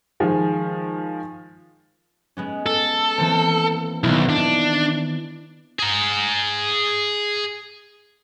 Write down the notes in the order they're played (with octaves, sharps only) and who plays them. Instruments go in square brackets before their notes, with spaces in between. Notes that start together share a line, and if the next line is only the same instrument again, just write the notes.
[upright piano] D#3 F3 G#3
[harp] G#3 B3 C#4
[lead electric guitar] A4
[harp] E3 A#3 C4
[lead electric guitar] B1 [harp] D#3 B3 E4
[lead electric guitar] D4
[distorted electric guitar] G#4 A#5